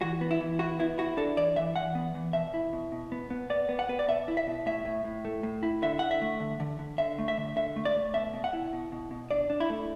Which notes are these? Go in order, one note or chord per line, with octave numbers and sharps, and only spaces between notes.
E3 F#4
B3
E4
E3
E4 F#4
B3 E4
E4 F#4
D4 A4
E3 D5
E3 E5
E3 F#5
B3
E3
B2 E5
E4
B2
B2
B3
B3
B3 D5
B3
F#5
B3 B4
D5
B2 E5
E4
E5
B2
A2 E5
A2
A2
A3
A2
E4
D3 E5
D3 F#5
E5
A3
D3
D3
D3
D3 E5
A3
E5
D3
D3 E5
A3
D5
A3
B2 E5
B2
F#5
E4
B2
B2
B2
D4 D5
D4
E4
A3